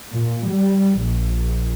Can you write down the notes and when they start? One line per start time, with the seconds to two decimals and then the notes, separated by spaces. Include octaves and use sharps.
0.14 A#2
0.50 G3
1.01 A#1